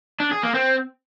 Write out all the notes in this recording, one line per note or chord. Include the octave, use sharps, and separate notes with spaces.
D4
G#4
A#3
C4